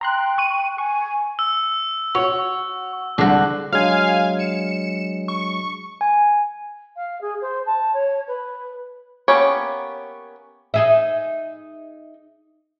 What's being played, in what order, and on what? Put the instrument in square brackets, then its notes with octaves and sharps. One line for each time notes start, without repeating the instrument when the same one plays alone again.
[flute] G5 [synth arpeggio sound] A#5 C6 F#6
[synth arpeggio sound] C#6 F#6 D#7
[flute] G#5 [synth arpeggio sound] C#6
[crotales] E6
[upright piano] F#4 F#5 [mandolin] C#5
[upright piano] C2 D3 G#3 [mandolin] D4 F#4
[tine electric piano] F#3 G#3 D4 [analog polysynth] F5 G#5
[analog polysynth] C#7 E7
C#6
[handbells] G#5
[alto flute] F5
G#4
C5
A5
C#5
B4
[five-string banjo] A#3 B3 C#4 G4 C#5
[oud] D#4 G#4 E5